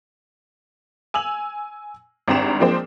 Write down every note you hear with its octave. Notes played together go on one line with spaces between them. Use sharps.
G#5 E6 F7 F#7
G#1 G2 C4 A#5 E7 F7
F3 G#3 A#3 C4 D4 C5